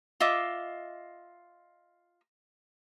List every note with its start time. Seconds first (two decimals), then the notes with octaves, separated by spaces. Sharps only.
0.20 F4 D#5 E5 D6